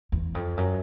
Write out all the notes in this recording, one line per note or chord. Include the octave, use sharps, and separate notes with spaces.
E2
F2
F#2